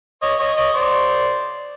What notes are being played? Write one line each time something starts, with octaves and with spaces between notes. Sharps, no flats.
C#5 D#5
C#5 D#5
C#5 D#5
C5 D5